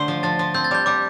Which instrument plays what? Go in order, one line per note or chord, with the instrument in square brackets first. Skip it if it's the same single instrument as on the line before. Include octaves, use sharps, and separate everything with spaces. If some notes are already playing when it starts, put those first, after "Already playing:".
Already playing: [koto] D3 A3 C5
F3
[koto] F3 [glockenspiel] A5 A6
[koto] F3
[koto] C4 [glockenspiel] G6
[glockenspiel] A6
[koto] G3 [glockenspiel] G6
[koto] G3 [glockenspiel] D6